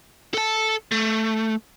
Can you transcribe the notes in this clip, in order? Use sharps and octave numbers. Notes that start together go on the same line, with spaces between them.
A4 A5
A3